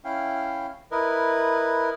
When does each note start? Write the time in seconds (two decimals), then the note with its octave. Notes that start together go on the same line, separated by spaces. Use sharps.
0.04 C#4 E4 F5 G5
0.91 E4 A#4 B4 D#5